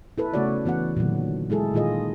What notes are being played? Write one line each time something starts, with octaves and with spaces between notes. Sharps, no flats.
E4 A4 B4
C#3 A3 B3 F#4 C#5 D5
E3 B3 F#4 F#5
A#2 D3 D#3 F#3
G#3 E4 G#4 A4
A#2 D#3 F4 G#4 D#5